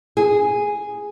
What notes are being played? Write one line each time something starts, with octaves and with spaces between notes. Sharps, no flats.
G#4